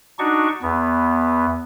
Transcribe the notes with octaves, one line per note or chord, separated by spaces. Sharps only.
D4 D#4 F#4 C#6
E2 B3